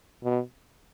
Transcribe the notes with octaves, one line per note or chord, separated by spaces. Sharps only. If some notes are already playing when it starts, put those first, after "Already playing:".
B2